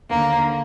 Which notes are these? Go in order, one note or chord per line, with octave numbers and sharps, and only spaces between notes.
D#2 D3 A#3